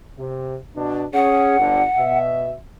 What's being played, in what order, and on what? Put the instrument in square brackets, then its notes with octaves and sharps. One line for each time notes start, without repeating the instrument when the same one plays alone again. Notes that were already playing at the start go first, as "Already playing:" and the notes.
[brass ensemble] C3
B2 D4
[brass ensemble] C#4 G#4 [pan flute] F#5
[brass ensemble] G1 D3
B2 E5